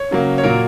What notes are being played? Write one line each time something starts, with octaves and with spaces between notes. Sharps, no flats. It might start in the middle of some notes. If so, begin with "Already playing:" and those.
Already playing: C#5
C#3 F#3 A#3
C#5
A#2 F#3 A#3 A#4